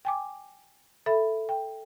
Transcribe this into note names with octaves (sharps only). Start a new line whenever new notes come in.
G5 G#5 D6
A4 E5 B5
G5